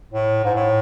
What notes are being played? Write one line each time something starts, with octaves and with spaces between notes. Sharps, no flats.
A2
G#2
A2